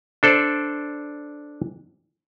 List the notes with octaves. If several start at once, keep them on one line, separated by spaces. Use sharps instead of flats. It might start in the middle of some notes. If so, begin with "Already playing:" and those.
D4 A4 C5 D5